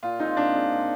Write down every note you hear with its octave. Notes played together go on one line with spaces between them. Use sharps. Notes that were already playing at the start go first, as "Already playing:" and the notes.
A#2 F4
G#3 C4 D#4 F4
A#2 D4
G#3 C4 F4
A#2